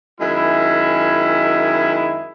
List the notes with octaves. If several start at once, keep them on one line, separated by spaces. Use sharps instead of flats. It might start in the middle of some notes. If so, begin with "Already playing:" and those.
F#2 D#3 G#3 E4